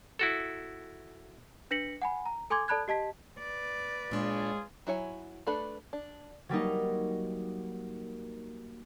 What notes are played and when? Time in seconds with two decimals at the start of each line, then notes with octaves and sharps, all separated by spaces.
0.19 E4 F#4 A4
1.71 D4 B4 A#6 B6 C#7 F#7
2.02 F#5 G#5 B5
2.26 A#5
2.50 A4 G#5 C6 D6 G#6
2.68 A4 D5 A5 B5 F#6 G#6
2.88 G4 D#5 A5 B6
3.38 B4 D5
4.11 A#2 G#3 D4 F4 G#4 C#5
4.87 F#3 E4 C#5 G#5
5.47 A3 D4 A4 B4 B5
5.93 D4
6.49 F#3 G3 A#3 D#4